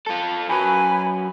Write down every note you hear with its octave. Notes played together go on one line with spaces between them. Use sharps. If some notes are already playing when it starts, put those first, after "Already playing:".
F4 A4
F#2 F#3 B4 G#5 B5